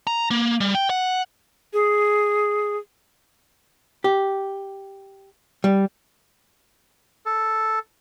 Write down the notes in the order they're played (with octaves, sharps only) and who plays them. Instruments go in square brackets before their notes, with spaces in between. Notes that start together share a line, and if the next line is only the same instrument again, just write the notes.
[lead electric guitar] A#5
A#3
G3
G5
F#5
[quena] G#4
[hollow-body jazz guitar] G4
G3
[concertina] A4